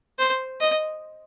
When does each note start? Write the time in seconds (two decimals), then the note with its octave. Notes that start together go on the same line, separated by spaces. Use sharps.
0.19 C5
0.60 D#5